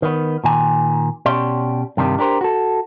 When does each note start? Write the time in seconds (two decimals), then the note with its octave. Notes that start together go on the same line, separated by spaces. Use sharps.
0.02 D#3 B3
0.44 A#2 D#3 G#5
1.26 B2 C#4 G4 D5 C6
1.97 G2 C3 D#3 G3
2.19 D4 G4 A#4 C5
2.41 F#4 A4